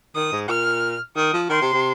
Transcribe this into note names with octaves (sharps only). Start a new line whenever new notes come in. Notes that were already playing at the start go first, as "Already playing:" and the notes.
D#3 D#6
G#2
A#2 F6
D#3 D#6
F3
D#3 C6
C3
C3